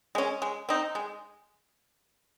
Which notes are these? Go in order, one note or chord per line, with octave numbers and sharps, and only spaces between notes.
G#3 C#4
G#3
C4 D#4
G#3